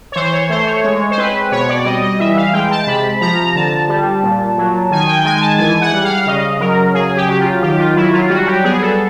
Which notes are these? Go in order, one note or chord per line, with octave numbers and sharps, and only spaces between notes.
C#5
E3 C5
C#5
A3 C5
C#5
G#3 C#5
C5
C4 B4
B2 C#5
D5
G3 D#5
D#5
E3 E5
F5
G#3 G5
A5
C3 B5
F3 A#5
D3 A5
G3
A#2
F#3
D#3 G#5
G5
G#3 G#5
A5
E3 G#5
F#5
G3
F5
C#3 D#5
F#3 A#4
C#3 G#4
G4
F#3
F4
D#3 G4
F4
F#3 E4
F4
G3 F#4
G4
B3 G#4
A4